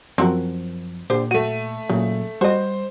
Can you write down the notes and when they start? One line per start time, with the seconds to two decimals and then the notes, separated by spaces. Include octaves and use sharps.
0.18 F#2 F3 C4 F#4 A#4
1.10 A#2 D3 G4 C5
1.31 A3 F#4 D#7
1.89 A#2 C#3 F#3
2.41 G3 F#4 C5 D#5